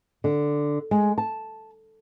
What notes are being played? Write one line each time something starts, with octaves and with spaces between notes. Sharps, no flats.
D3
G#3
A5